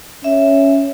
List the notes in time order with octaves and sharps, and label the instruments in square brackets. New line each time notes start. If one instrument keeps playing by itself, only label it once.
[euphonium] C#4 [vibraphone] E5